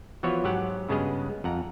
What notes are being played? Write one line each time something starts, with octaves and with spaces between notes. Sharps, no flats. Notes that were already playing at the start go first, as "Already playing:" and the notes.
E3 F3 B3 F#4 C#5
G#2 F#3 G4 F#5
G2 C#3 G#3 B3 G#4 D#5
F2 F#5 A#5